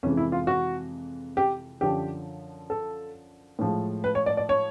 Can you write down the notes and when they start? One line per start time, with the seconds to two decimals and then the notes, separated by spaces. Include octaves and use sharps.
0.03 F2 C3 E3 G#3 C#4
0.17 E4
0.32 F4
0.47 F#4
1.37 G4
1.81 F#2 D3 F3 G4
2.70 A4
3.59 A2 F3 G#3
4.04 B4
4.15 C#5
4.26 D5
4.37 D5
4.49 C#5